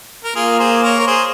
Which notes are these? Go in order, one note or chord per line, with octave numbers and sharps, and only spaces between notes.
A#4
A#3 F4 G#4
G#4 C5
A#4 C#5
A#4
G#4 C5